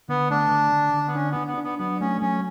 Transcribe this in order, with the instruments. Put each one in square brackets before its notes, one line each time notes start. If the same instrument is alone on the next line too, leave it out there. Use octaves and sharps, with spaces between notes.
[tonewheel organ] D3 [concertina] B3
[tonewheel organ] A3 [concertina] D4
[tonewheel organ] D3
D3
D3
[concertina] B3
[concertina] C#4 [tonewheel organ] D4
[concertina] B3
[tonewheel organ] D4
[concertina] B3
[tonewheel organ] D4
[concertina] B3
[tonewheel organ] F#3 [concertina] B3
[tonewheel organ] A3 [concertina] C#4
[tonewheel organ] F#3 [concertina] C#4